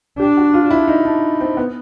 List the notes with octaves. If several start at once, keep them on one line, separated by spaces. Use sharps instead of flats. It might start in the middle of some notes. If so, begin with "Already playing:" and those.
D4 G4
F#4
F4
E4
D#4
D4
C4
B3